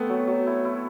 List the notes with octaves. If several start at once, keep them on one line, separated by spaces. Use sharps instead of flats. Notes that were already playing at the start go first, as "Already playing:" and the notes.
Already playing: A3 B3 C4
F#3
F#3
E4
E4